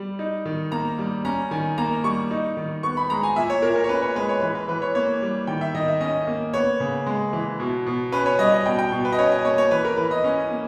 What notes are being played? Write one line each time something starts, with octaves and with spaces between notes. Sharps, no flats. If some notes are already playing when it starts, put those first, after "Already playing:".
Already playing: G3
D#4
D#3
A#3 A#5
G3
C#4 A#5
D#3 G#5
A#3 A#5
G3 C#6
D#4
D#3
B3 C#6
B5
G#3 A#5
G#5
A#2 E5
C#5
A#2 A#4
A#4
C#5
C#4 B4
C#5
G#3 B4
C#5
E3 B4
B4
E3 B4
C#5
A#3 C#5
G3
D#3 G5
E5
D#3 D#5
E5
C#4 D#5
A#3
B3 C#5
C#3
G#3
E3
B2
B2
C#4 B4
C#5
G3 D#5
D#5
B2 G5
G5
B2
B4
D#5
C#4 C#5
D#5
A#3 C#5
C#5
E3 B4
A#4
E3 B4
D#5
C#4
A#3